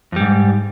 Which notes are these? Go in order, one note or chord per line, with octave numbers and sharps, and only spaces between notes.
F2 G#2 G3